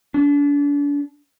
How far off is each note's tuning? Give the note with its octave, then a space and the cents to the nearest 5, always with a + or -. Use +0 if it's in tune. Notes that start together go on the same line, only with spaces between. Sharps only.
D4 -35